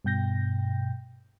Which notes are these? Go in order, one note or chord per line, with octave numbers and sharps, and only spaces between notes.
G2 B2 G5 G6 A#6